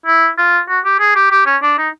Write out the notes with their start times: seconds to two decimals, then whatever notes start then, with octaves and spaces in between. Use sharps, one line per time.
0.06 E4
0.38 F4
0.69 F#4
0.85 G4
1.00 G#4
1.16 G4
1.31 G4
1.46 C#4
1.62 D4
1.78 D#4